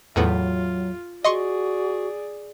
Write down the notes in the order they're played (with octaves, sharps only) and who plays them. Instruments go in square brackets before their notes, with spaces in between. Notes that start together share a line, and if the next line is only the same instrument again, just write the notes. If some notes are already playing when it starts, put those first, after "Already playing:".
[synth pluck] E2 A2 B3 [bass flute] F#3 [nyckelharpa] F4
[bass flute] F#4 [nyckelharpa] G#4 D5 [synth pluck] D#5 C6 C#6